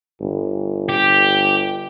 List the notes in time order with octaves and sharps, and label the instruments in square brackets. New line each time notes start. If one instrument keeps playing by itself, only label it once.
[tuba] G1
[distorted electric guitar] G4